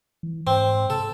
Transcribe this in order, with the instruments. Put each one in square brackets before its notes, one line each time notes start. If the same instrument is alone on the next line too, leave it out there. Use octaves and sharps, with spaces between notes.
[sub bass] E3
[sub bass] G#2 [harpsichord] C4
[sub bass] C3 [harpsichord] A4